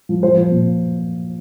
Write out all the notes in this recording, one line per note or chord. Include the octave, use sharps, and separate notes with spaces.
F3
F3 C5
F3
A#2